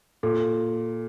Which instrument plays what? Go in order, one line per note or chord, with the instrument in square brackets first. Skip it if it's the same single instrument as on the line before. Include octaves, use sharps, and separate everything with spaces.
[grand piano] A#2 [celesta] A4